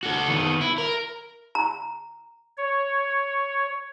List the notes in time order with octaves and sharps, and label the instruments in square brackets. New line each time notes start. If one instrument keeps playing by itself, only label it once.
[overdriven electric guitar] F#4 A4
D#3 B3
E4
A#4
[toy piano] A#5
[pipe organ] C#5